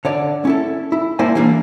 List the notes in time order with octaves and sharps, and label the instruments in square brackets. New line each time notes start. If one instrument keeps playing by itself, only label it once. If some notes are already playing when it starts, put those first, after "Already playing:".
[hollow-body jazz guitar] D3 C#5 D5
C#4 E4 A4
E4
A3 A#3 E4 C5 D5 G#5
E3 G3 A#3 C#4 D4